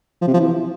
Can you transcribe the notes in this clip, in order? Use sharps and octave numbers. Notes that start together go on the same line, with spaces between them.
F3
C3
F3
E3